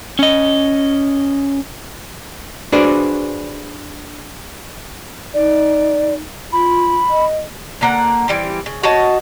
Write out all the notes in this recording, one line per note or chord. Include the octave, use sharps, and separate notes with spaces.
C#4 D#5
D4 F#4 G#4 B4 C5 D5
D#4 D5
F4 B5
D#5
D3 A#3 F#5
E3 G3 C4
C#3
F#4 C#5 D#5 A5